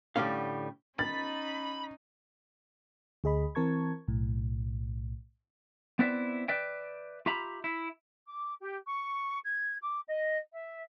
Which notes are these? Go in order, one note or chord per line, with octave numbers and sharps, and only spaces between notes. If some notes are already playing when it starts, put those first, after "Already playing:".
A2 D3 G3 C#4 F5
C#4 D#4 B5 A6
D2 G#4 D#5 B5
E3 C4 A#4 A5 C#6 G#6
B1 A2
B3 C4 E4 B4 D5 E5
B4 D5 E5 G5
F4 G4 E5 A#5 B5
E4
D6
G4
C#6
G#6
D6
D#5
E5